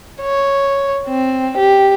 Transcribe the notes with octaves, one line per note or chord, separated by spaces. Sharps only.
C#5
C4
G4